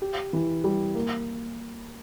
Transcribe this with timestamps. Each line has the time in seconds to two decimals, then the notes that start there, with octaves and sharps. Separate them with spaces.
0.02 G4
0.33 E3
0.64 G3
0.95 A#3